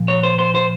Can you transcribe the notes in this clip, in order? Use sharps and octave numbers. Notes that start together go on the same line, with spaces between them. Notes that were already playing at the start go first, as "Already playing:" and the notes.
Already playing: A#2 F3
C#5
C5
C5
C5